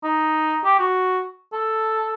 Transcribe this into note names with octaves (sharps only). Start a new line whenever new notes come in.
D#4
G4
F#4
A4